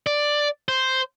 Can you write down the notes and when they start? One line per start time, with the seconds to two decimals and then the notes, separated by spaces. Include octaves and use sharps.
0.07 D5
0.68 C5